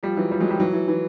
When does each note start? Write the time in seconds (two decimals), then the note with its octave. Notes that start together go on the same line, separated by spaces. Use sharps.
0.03 F3 G3
0.17 E3 F#3
0.31 F3 G3
0.40 F#3 G#3
0.50 F3 G3
0.60 E3 F#3
0.73 E3
0.88 E3